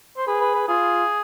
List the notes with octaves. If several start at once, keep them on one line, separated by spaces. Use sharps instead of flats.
C5
G#4 B4
B4
B4
F4 G#4